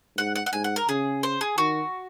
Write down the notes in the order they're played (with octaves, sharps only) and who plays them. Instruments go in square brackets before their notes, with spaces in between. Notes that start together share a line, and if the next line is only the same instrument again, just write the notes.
[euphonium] G#2 [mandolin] F#5
[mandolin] F#5
F#5
[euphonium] G#2 [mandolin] G#5
[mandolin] F#5
A#4
[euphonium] C#3 [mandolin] G#4
[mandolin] C5
G#4
[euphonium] D#3 [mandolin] F#4